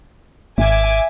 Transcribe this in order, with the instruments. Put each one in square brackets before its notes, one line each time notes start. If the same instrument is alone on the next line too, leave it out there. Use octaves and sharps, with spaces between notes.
[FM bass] G#1 [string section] E5 G#5 D6